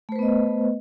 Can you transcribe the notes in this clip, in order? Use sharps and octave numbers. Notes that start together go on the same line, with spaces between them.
A3 B3 B4 C5 D#5